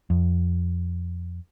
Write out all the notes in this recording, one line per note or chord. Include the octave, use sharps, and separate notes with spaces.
F2